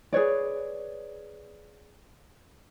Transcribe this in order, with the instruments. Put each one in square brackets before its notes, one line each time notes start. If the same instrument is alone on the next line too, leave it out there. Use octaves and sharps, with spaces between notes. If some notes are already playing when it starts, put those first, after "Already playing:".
[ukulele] G#4 B4 C#5 D5